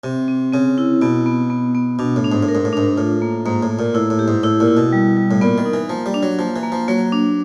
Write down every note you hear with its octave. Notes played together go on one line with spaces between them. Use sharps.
C3 C4
C4
C#3 C4
E4
B2 B3
B3
B3
B3
B2 D4
A2
D4
G#2
A2
A#4
G#2
A2
G#2 D4
A2 F4
A#3
G#2 A#3
A2
A#3
A#2
A2 E4
A2
G4
G#2
A2 E4
A#2
E4
B2
G3
G3
A2
A#2 B3
D#3
D#4
E3
F3 A#3
G3
D4
F#3
F3 A#3
E3
A#3
F3
F#3 A#3
D4